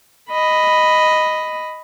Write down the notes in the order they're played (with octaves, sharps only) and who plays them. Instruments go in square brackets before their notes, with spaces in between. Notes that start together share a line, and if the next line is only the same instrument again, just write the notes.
[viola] D#5 B5